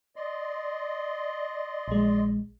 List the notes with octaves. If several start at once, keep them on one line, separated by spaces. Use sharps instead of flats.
D5 D#5 C6
A#1 G#3